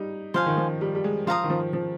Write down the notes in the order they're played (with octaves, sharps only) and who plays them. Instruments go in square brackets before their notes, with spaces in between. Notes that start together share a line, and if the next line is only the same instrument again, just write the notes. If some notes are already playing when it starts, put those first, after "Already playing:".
Already playing: [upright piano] G3 D#4
[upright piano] F3 [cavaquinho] C5 F5 G#5
[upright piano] D#3
F3
G3
G3
G#3
[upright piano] F3 [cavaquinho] C5 F5 A#5 D#6
[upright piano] D#3
F3
F3